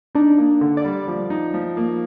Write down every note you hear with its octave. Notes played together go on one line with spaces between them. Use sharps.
D4 D#4
A#3
D3
D5
G3
F3
D#4
F3
A#3